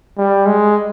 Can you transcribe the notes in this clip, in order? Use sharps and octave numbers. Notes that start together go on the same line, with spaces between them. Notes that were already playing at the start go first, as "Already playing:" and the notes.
G3
G#3